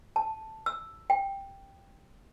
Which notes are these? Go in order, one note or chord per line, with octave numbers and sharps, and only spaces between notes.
A5
E6
G5